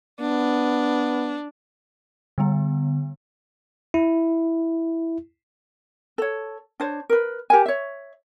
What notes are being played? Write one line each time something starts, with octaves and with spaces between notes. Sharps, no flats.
B3 D4
D3 G3 B3
E4
A4 C#5
D4 C5 C#5
A#4 B4
G4 A#4 G#5
C#5 E5